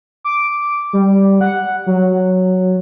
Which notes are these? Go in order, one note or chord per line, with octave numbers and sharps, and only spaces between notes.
D6
G3
F#5
F#3